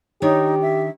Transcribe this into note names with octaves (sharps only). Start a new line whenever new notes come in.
D#3 D4 D#4 G4 C#5
E5